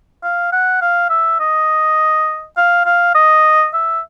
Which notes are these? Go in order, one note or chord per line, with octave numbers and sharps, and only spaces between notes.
F5
F#5
F5
E5
D#5
F5
F5
D#5
E5